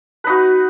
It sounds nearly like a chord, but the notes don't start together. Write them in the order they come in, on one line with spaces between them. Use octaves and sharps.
B4 D#4 F#4